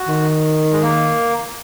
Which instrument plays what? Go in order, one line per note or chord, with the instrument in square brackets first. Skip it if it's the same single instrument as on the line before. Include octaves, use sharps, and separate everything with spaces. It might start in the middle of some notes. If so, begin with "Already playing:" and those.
Already playing: [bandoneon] F#4
[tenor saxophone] D#3
[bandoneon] G#3
A#3